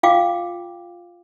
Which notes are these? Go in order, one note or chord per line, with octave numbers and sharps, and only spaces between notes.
F4 F5 G5 D6